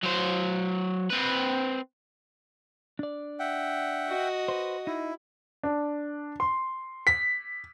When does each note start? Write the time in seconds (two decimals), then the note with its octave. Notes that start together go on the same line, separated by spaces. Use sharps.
0.03 F#3 C5
1.10 C4 B4
2.99 D4 D5
3.40 E5 F#5 G5
4.08 F#4 D#5
4.48 B4 C5
4.87 D#4 E4
5.63 D4
6.40 C6
7.07 B6